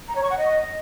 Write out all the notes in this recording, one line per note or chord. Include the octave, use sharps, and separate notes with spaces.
A#5
C#5
C#6
F#5
D#5